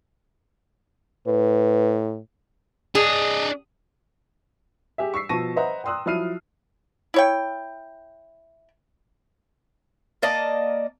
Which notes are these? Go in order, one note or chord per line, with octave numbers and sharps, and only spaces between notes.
A2 B4
D4 G#4 D#5
G4 G#4 E5
C#6 E6 B6 C7
B2 F3 A5 C#6 A#6 D#7
B4 C5 D#5 E5 F#5 A#5
G5 A#5 C6 D#6 E6 F#6
F3 F#3 E4 F6 C7 D#7
E4 C#5 G5
A#3 D5 D#5 A5